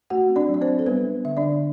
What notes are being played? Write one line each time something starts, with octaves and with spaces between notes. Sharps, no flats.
A3 F#4 F#5
C4
D4 D5
F#3
D5
C4 C5
F#3
A4
G3 B3 B4
D4
D3 E5
D4 D5
D3